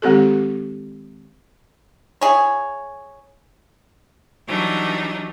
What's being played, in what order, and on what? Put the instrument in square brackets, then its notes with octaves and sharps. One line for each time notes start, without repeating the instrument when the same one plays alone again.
[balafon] D#3 G#3 C4 G4 A4
[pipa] E4 G#4 C#5
[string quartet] E3 F#3 G3 D4 D#4